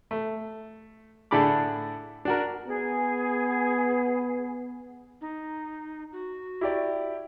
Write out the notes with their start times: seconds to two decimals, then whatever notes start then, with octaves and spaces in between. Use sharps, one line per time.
0.11 A3
1.31 A2 D3 D4 G#4 B5 D6
2.25 D4 F#4 A#4
2.67 B3 G#4
5.21 D#4
6.12 F#4
6.61 E4 G4 D5